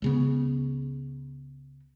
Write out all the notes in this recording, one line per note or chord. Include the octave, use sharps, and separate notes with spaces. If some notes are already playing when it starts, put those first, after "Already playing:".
C#2 C#3 B3